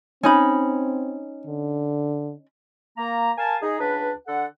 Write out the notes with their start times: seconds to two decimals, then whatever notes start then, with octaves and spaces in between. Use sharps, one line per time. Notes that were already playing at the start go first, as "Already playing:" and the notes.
0.23 C4 C#4 D#4 B5
1.46 D3
2.98 A#3 A#5
3.37 A#4 F5 G#5 A5
3.62 D#4 G#4
3.81 C#2 D4 B4
4.27 D3 A4 F#5